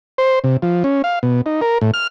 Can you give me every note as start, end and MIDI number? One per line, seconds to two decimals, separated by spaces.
0.18 0.39 72
0.44 0.57 48
0.62 0.83 53
0.84 1.02 61
1.04 1.19 77
1.23 1.41 47
1.46 1.61 63
1.61 1.78 70
1.81 1.91 45
1.94 2.07 89